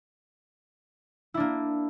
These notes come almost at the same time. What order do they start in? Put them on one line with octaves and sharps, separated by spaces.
E4 D4 A#3